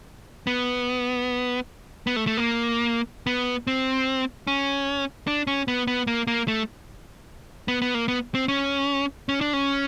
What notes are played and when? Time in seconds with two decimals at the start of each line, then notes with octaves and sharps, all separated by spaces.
0.47 B3
2.07 B3
2.16 A3
2.27 A3
2.37 A#3
3.27 B3
3.67 C4
4.47 C#4
5.27 D4
5.47 C#4
5.68 B3
5.87 B3
6.07 A#3
6.27 A#3
6.48 A3
7.68 B3
7.82 B3
7.94 A#3
8.08 B3
8.35 C4
8.48 C#4
9.29 C#4
9.41 D4
9.53 C#4